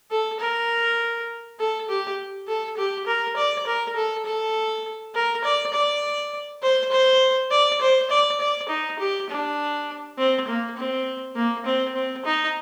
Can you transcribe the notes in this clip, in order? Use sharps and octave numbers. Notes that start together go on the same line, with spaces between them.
A4
A#4
A4
G4
A4
G4
A#4
D5
A#4
A4
A4
A#4
D5
D5
C5
C5
D5
C5
D5
D5
D#4
G4
D4
C4
A#3
C4
A#3
C4
C4
D#4